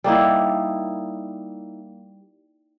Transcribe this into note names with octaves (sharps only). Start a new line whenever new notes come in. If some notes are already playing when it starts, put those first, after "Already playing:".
G3 A#3 D#4 E4